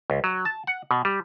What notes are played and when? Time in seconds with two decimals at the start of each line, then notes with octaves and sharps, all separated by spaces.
0.10 C#2
0.24 F#3
0.45 A5
0.67 F#5
0.91 B2
1.05 G3